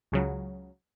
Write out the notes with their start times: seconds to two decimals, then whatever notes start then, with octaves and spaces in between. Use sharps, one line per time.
0.12 C#2 C#3 F#3